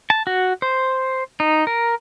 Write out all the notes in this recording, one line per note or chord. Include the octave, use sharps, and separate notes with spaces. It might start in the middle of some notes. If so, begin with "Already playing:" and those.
A5
F#4
C5
D#4
A#4